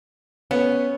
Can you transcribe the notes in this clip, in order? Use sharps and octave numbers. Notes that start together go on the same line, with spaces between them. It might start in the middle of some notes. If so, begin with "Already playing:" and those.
B3 C#4